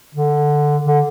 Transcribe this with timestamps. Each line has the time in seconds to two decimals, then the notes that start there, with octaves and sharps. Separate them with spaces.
0.15 D3
0.84 D3